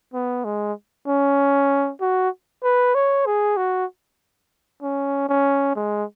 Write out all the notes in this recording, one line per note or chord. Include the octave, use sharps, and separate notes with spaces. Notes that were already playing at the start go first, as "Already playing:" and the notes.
B3
G#3
C#4
F#4
B4
C#5
G#4
F#4
C#4
C#4
G#3